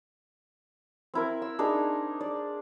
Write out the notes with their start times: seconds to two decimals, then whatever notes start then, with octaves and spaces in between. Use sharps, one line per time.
1.14 C4 E4 A#4
1.42 E6
1.59 D4 D#4 G#4 A#4
2.21 D5